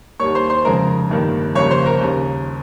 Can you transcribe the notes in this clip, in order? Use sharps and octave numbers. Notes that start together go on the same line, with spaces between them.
D#2 D#3 G3 A#3 C#5 C#6
C5 C6
C5 C6
F1 F2 C#3 G#3 A#4 A#5
G1 G2 D#3 A#3
G1 F2 C#3 G3 A#3 C#5 C#6
C5 C6
A#4 A#5
D#2 C#3 G3